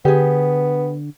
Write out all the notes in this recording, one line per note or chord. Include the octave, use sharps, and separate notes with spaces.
D3 B3 G4 G#4